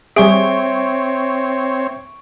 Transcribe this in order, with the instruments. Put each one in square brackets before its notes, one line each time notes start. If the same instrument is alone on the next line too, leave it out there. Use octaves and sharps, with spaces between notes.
[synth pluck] G3 G4 G#4 [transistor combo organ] C4 C#5 [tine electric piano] E5 [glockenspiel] C#6 D7